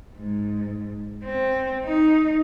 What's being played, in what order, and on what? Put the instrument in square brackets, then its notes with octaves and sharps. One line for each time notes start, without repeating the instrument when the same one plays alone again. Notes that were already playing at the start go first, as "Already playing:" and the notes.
[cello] G#2
C4
D#4